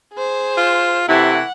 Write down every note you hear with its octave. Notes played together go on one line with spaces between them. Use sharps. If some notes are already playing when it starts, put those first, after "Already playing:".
G#4 C5
F4
C3 E3 A3 E4 F#5